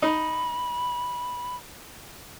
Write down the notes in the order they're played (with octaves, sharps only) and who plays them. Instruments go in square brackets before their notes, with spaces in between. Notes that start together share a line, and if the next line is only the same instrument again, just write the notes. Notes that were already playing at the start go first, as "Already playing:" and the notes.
[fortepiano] D#4 [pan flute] B5